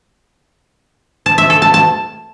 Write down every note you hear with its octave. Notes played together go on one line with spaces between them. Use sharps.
A5
E5
A4
A5
A5